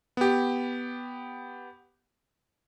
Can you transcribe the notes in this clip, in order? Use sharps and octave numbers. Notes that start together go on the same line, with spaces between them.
B3 G4